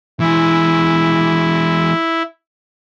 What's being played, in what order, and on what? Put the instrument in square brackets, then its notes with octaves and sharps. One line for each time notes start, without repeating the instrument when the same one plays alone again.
[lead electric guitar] E3 G#3 [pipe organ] E4